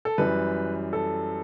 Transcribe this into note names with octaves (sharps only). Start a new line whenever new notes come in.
A4
F#2 E3 G3 B4
A4